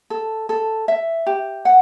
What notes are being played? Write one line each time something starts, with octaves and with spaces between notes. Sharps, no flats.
A4
A4
E5
G4
F#5